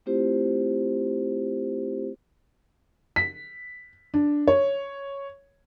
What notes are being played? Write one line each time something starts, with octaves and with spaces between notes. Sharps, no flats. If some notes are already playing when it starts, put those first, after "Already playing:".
A3 C4 E4 F4 G4 C5
B6
D4
C#5